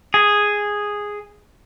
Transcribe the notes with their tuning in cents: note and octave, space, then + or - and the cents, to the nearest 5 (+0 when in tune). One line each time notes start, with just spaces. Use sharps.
G#4 -5